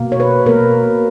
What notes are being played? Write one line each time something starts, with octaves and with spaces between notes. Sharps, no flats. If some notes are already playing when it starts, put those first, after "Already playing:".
Already playing: B2 A#3
C#5
B4
B2 A#3 A#4